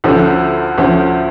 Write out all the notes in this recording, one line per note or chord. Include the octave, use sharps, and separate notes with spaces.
D2 D3 F3 C#4
D2 D3 F3 C#4